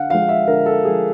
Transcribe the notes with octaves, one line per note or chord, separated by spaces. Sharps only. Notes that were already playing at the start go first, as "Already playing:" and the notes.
Already playing: D3 F5 F#5
F3 G#3 F5
E5
D3 A#4
A4
F3 G#3 G#4